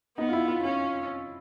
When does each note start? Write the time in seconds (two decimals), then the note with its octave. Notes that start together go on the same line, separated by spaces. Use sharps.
0.17 B3 D#4
0.28 F4
0.33 E4
0.48 F4
0.63 C#4 F4